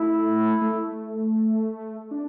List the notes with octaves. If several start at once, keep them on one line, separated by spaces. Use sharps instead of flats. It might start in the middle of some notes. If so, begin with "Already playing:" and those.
Already playing: A3 E4
A3
D4